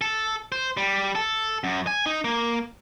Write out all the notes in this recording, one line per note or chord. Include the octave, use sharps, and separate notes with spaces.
A4
C5
G3
A4
F#2
G#5
D#4
A#3